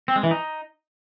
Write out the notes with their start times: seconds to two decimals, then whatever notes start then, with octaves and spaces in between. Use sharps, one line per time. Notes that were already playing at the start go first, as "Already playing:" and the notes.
0.08 C4
0.16 G#3
0.23 E3
0.31 D#4